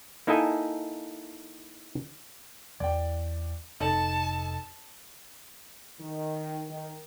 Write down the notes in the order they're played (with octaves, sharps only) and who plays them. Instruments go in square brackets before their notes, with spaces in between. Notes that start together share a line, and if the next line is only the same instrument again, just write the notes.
[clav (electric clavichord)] A#3 D#4 E4 A4 D#5 G#5
[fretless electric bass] E2 E3 [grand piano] D5 G5
[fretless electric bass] F1 [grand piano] D#4 A4 F#7 [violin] A5
[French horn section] D#3
D#3